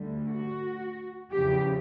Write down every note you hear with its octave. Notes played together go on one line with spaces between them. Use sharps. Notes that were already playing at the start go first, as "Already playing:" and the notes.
Already playing: D2 D3 G3
F#4
E2 C#3 F3 G4